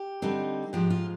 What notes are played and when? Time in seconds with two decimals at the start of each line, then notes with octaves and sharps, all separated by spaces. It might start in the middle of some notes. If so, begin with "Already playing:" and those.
Already playing: G4
0.22 D3 G3 C4 D#4
0.73 G#2 F3 G#3 G4
0.90 F4